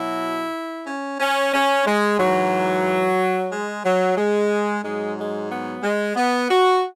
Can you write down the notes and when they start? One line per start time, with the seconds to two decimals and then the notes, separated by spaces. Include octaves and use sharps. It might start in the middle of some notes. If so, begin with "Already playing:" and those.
Already playing: B2 F#3 E4
0.87 C#4
1.20 C#4
1.53 C#4
1.86 G#3
2.19 G#2 E3 F#3
3.51 G#3
3.84 F#3
4.17 G#3
4.83 G#2 F#3 G#3
5.17 G#3
5.50 B3
5.82 G#3
6.16 B3
6.49 F#4